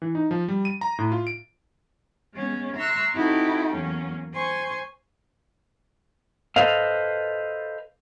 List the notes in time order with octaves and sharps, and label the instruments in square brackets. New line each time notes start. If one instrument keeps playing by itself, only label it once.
[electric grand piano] E3
D#4
F3
G3
D#7
A#5
A2
F4
D7
[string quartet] G#3 B3 C#4
E5 A#5 C6 C#6 E6 F#6
C4 D#4 E4 F#4 G4 A4
E2 F#3 A#3 C#4
C5 G#5 C6 C#6
[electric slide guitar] A4 B4 C5 D#5 F5